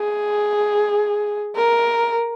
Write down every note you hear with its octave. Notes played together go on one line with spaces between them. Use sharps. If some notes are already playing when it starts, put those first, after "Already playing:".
Already playing: G#4
A#4